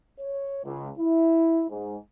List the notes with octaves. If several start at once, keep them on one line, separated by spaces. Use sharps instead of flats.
C#5
C#2
E4
G#2